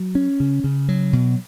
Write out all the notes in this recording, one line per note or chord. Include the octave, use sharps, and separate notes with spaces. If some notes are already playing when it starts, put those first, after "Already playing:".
Already playing: F#3
C#4
C#3
C#3
F#3
B2